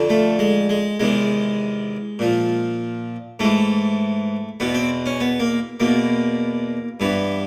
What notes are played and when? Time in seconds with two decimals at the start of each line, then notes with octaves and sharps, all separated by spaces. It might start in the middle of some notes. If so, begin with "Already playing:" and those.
Already playing: F2 D3 F3
0.09 A3
0.39 G#3
0.69 G#3
1.00 E2 C3 D#3 G#3
2.19 A#2 F3
3.39 G#2 E3 A3
4.60 E2 B2 B3
4.75 C4
5.06 C#4
5.20 B3
5.40 A#3
5.80 E2 B2 A#3
7.00 G2 E3 B3